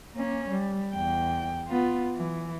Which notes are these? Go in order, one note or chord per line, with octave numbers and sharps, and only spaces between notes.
A#3 C#4
G3
E2 G5
B3 F4
E3